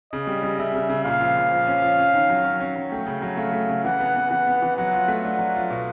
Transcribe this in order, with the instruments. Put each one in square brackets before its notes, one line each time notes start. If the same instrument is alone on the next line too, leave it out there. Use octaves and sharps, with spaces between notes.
[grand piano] C#3 [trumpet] D#5
[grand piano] G3
G3
[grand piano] C#3 [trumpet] E5
[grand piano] C#3
C#3
[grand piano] A#2 [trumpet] F5
[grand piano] F3
A#2
F3
C#4
F3
C#4
D#3
F#3
C#4
C#4
F#3
[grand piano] A3 [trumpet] G5
[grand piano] C#3
F#3
[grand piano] A3 [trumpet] F5
[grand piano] A3
C#3
[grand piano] E3 [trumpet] F#5
[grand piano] B3
B3
[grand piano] E3 [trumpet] F#5
[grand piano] B3
E3
[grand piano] F#3 [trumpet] F#5
[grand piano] F4
A3
[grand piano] D4 [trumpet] F#5
[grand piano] F#3
F4
B2